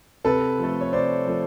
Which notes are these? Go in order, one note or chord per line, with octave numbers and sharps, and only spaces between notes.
C3 A4 B4
F3
A3
C#5
C3 C5 D5
F3 A3